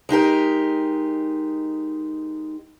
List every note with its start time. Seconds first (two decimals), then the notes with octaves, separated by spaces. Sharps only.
0.09 G#3 D#4 G4 A#4